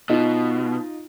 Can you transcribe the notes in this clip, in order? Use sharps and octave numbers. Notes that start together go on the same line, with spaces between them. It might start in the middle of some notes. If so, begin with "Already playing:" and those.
B2 D#4 F4